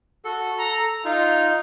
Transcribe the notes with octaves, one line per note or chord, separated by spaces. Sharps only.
F#4 A4
A#5
D#4 F4